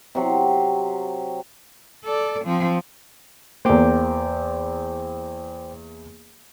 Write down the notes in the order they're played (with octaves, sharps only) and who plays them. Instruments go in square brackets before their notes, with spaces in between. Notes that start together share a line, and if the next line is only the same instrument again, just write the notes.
[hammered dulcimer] C3 F#3
[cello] A4 D5
F3 C4
[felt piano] E2 A#3 [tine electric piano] C5 G5 D6